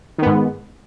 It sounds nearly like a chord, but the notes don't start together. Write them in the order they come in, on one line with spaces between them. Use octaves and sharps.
D#3 B3 G#2